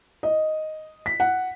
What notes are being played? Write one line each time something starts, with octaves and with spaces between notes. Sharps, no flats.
D#5
B6
F#5